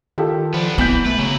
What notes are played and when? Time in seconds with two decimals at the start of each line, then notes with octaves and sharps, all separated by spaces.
0.18 D#3 F4 G4 A4
0.54 F3 B3 D4
0.78 B1 E3 B3 G6 B6 F#7
1.06 A3 B4
1.19 C#3 F#3 E4